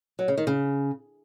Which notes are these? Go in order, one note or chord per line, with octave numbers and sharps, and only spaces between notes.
F#3
C#3
D#3
C#3